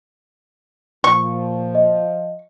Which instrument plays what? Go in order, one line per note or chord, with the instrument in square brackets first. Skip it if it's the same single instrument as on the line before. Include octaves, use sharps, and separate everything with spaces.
[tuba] A#2 [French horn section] F3 [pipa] C#6
[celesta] D#5